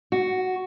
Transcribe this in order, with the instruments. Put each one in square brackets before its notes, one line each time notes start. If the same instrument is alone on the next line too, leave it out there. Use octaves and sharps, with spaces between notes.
[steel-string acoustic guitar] F#4